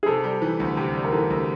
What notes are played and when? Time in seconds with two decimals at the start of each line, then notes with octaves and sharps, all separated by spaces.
0.03 G#4
0.06 C3 A4
0.24 G3
0.42 E3
0.60 D2
0.77 C3 G4
0.95 G3
1.05 A#4
1.12 E3 A4
1.30 D2